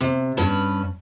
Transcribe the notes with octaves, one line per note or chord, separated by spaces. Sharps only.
C3
G2 C#4 B4 A5